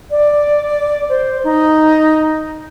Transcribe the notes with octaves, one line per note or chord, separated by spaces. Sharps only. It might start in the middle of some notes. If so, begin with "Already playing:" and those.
D5
C5
D#4